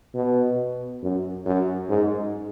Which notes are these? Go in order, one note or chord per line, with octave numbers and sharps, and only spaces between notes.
B2
F#2
F#2
G#2